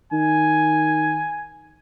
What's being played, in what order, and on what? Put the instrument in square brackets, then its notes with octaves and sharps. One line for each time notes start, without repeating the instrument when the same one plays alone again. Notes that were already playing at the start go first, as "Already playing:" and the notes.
[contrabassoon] D#3 [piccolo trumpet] G#5